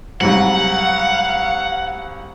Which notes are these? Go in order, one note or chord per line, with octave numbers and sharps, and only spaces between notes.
C2 G#2 F#3 F5 F#5